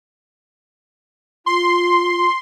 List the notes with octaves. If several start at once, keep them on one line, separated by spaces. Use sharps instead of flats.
F4 C6